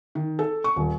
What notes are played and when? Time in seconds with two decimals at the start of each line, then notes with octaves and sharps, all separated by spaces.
0.15 D#3
0.39 A4
0.64 C#6
0.76 D#1